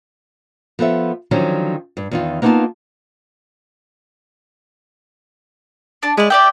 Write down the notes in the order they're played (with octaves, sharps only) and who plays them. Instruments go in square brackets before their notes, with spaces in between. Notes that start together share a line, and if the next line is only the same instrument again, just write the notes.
[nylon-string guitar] F3 B3 A4 E5
D3 D#3 F3 F#3 C#4
G2
E2 D#3 F4
A#3 B3 D4 D#4 F4 A5
[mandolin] D4 A5
[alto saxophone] G#3 [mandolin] E4 D5
[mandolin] G4 D5 E5 [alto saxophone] G5